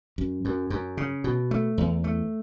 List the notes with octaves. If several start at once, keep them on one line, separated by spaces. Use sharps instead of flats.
F#2
F#2
F#2
C#3
B2
A3
E2
A3